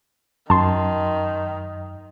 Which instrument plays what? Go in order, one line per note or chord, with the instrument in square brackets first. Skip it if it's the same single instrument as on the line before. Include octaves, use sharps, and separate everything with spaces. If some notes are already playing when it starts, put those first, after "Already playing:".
[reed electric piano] F#2 [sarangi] D#3 [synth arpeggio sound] A5 C6